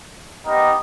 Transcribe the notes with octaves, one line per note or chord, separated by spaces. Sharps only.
B3 D#4 G4 A#4 D#5